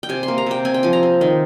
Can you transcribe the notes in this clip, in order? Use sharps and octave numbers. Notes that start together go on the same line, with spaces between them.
G5
C3 G#5
C6
A#3
A#5
C3 G5
C4 G#5
G5
F3 G#5
A#5
C4
D#3